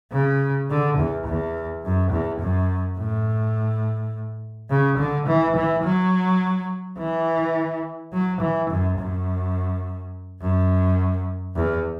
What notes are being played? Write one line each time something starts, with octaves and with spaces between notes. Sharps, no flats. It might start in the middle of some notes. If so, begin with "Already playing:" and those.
C#3
D3
E2
E2
F#2
E2
F#2
A2
C#3
D3
E3
E3
F#3
E3
F#3
E3
F#2
F#2
F#2
E2